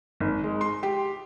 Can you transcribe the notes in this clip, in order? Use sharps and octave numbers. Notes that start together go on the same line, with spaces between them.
G#1
G#3
C6
G4